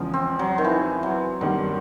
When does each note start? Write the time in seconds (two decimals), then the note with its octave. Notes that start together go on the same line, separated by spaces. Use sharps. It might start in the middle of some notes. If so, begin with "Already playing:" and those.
Already playing: E2 C#3 F3 G#3
0.14 C4
0.39 F#3
0.58 D#3
0.65 E3
1.03 F#3
1.41 G2 D#3 F#3 G3 A#3